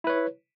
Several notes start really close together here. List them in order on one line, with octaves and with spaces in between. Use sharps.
E4 B4 C#5